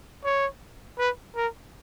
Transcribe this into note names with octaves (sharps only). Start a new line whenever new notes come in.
C#5
B4
A#4